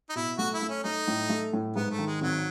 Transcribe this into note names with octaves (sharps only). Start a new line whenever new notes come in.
D#4
B2 E4
A3 F#4
E4
A3
C#4
A3 D#4
A2
A3
A2
G#2 B3
A3
D#3
G#3
G#1 F#3